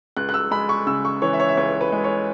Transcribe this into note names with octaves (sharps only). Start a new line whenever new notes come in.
C#2 F#6
F#6
E6
G#3 B5
C#6
C#3 E6
C#6
E3 C#5
E5
C#5
E5
C#2 C#5
B4
G#3
C#5